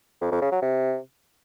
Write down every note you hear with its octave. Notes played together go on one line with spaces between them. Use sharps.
F2
F2
C#3
F#3
C3